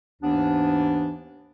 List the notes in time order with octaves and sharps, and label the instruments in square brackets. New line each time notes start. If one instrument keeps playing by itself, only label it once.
[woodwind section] D#2 G#2 E3 B3 D4